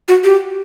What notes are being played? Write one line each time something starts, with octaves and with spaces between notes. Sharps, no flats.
F#4
G4